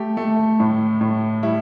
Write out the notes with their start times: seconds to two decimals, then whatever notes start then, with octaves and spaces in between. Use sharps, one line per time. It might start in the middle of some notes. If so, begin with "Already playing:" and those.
Already playing: A3 G4
0.17 A3
0.60 A2
1.01 A2
1.43 G3 E4